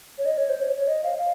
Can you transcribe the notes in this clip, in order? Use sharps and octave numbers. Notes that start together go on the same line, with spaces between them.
C#5
D#5
C#5
C5
C#5
C#5
D#5
F5
F5